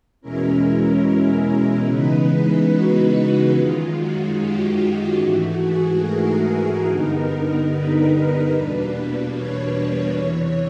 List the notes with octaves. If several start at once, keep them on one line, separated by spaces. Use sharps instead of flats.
E2 B2 G#3 C#4 E4 A#4
C#3 E3 G#3 B3 D#4 B4
B4
F#4
F#2 D#3 G#3 F4
F#4
G4
F4
G#2 E3 A3 F#4
G#4
A#4
G2 D3 G3 B3 D#4 A#4
B4
E2 B2 G3 A#3 D4
C#5
E2 C3 E3